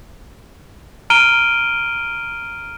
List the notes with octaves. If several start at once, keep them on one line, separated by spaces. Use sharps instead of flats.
A#5 F6 D7 D#7 G7